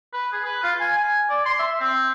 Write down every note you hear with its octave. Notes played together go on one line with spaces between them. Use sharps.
B4
G#4
B4
F4
G#5
G#5
D5
C6
E5
C4